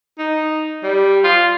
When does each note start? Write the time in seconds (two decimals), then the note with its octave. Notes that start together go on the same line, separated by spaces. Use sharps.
0.19 D#4
0.83 G3
1.24 F4